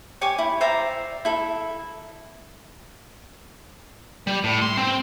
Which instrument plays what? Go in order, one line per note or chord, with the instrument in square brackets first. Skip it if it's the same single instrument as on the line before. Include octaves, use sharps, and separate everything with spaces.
[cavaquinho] G4 C#5 G#5 D6
E4
C5 D5 E5 A#5
E4 A4
[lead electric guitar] G3
A2
C6
C4